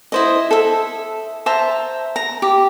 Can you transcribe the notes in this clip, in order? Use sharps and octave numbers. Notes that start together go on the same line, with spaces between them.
E4 C5 D#5
A4 E5
C5 E5 A5 A#5
A#5
G4